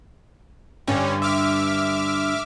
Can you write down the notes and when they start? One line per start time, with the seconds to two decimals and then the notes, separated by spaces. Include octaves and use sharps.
0.88 G2 D3 G3 C#4
1.22 E5 D6 F6